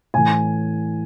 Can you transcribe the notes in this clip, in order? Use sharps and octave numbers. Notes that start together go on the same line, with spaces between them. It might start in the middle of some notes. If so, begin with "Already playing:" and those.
A2 E3 G#5